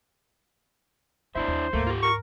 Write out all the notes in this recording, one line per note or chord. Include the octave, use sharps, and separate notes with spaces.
A#3 D4 E4 F4 C5 E5
D#2 E3
D2 G#2 A3 A#3
F4 G4
A#4 C#6